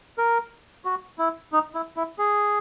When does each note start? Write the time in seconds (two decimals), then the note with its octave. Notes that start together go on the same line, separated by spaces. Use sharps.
0.18 A#4
0.85 F#4
1.19 E4
1.52 D#4
1.75 E4
1.97 E4
2.18 G#4